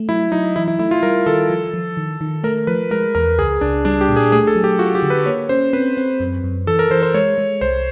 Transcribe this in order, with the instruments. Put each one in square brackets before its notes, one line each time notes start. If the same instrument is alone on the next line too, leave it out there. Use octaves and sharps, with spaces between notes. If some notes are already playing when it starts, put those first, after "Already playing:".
Already playing: [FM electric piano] A3
[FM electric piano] F#3 [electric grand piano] E4
[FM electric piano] F#3 [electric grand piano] D#4
[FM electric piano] E3 [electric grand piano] E4
[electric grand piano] E4
[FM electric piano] A3 [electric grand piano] E4
[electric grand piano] F4
[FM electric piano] G3 [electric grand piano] A#4
[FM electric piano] D#3 [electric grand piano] A4
[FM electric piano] F3
F3
D#3
D#3
[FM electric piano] A3 [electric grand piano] A#4
[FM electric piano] F3 [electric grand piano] B4
[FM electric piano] G#3 [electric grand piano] A#4
[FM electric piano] E2 [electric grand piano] A#4
[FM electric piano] C#2 [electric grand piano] G#4
[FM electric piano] C#2 [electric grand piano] D4
[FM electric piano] G3 [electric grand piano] D4
[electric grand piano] G4
[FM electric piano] A#2
[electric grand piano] G#4
[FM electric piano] A3 [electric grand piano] G#4
[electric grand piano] A4
[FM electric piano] F#3
[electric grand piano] G4
[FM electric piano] F4 [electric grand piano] F#4
[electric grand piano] G4
[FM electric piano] D3
[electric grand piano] B4
[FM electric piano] A#3 [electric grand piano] C#5
[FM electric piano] C#4 [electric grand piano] C5
[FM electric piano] C4 [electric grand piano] B4
[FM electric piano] C4
F#2
F#2
[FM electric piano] E3 [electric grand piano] A4
[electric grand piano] A#4
[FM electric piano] E3 [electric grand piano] C5
[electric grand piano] C5
[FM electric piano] G#3 [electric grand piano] C#5
[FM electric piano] G#3
[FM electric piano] C2 [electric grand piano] C5